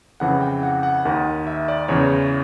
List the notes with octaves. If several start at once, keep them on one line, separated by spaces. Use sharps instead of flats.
F2 C#3 E3 F#5
G5
F#5
F#5
D#2 D#3 F#5
E5
D5
E2 C#3 E3 C#5